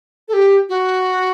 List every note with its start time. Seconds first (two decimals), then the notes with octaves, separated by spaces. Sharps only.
0.28 A4
0.33 G4
0.69 F#4